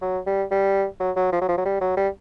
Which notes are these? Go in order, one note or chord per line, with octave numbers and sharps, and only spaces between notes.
F#3
G3
G3
F#3
F#3
F3
F#3
F3
F#3
G3
F#3
G3